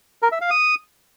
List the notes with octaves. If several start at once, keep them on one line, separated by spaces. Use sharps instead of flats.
A#4
E5
F5
D#6